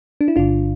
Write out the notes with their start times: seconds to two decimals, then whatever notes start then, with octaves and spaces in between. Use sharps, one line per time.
0.21 D4
0.28 E4
0.36 G1 G2 D3 D4 F4